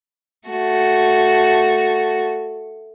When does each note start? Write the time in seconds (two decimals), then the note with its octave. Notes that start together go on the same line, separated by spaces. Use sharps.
0.49 A3 F#4